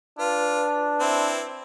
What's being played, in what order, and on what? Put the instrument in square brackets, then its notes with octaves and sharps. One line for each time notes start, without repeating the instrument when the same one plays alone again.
[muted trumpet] D4 [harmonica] F4 [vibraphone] B4
[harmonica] C4 E4